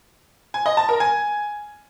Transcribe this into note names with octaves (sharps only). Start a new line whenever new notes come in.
G#5
D#5
A5
A#4
G#5